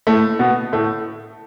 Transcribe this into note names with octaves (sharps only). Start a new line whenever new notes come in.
A2 A3
B2 B3
A2 A3